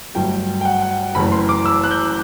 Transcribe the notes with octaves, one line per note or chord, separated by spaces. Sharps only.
G1 G2 F#3 A3 G5
G5
F#5
F#5
F#1 F#2 E3 A3 B5
C6
D6
E6
F#6
G6